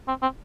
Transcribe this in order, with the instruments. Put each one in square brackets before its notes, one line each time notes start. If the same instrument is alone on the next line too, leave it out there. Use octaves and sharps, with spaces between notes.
[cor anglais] C4
C4